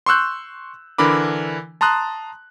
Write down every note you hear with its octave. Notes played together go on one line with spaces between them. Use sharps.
C6 C#6 E6 F#6 G6
D3 E3 D4 A#4 B5 D6
A5 A#5 C6 D#6 F#6